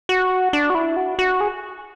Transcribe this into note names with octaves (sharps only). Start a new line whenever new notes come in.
F#4
D4
F#4
E4
F#4
F#4
G#4